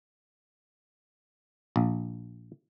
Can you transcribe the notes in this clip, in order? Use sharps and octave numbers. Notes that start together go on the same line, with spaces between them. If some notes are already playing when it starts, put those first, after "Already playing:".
A#1